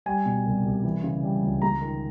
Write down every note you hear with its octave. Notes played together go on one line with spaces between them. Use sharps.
G3 G#5
B2
C2
C2
E3
C#3
G3
C#2
G#3 A#5
D#3